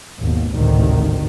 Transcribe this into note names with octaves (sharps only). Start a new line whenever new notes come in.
G#1 D#2 B2
G#1 D2 A2 C3 D#3